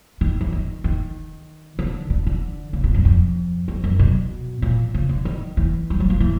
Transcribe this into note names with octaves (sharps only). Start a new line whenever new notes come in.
D#3
E3
D#3
D#3
D3
D3
D3
C#3
B2
F#2
F2
F2
F#2
B2
A#2
C#3
D3
D#3
E3
G3
F#3
F3
E3